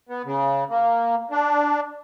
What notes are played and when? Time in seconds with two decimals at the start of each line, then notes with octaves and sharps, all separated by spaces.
0.09 B3
0.25 C#3
0.70 A#3
1.31 D4